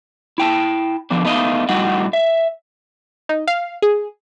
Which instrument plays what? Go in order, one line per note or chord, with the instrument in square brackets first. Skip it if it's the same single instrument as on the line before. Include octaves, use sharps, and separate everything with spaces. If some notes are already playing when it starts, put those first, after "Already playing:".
[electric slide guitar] E4 G5 A5
D3 F3 B3 D4
A3 B3 D#4 D#5 F5
A2 G3 D#4 F#4 D#5 F#5
E5
[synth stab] D#4
F5
G#4